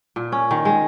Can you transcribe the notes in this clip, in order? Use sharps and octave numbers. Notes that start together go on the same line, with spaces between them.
A#2
C#4
D#3
G#3